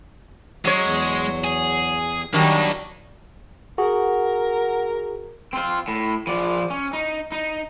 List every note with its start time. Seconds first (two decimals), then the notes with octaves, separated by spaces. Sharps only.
0.65 F#3 G#3 C#5
0.86 E2
1.44 G#4
2.34 D#3 F#3 G3 A#3 D4 D#4
3.78 F#4 G#4 A#4 F#5
5.53 C4 F4
5.88 A2
6.27 F3 D5
6.70 C#4
6.93 D#4
7.32 D#4